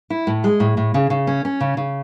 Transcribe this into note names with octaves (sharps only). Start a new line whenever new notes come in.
E4
A2
G#3
A2
A2
C#3
C#3
C#4
C#4
C#3
C#3